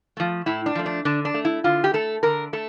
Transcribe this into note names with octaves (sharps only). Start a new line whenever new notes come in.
F3 A3
A2 E4
D4
F3 A3
D4
D3 D4
D4
A3
E4
D3 F4
G4
A3 A4
D3 A#4
A3 A4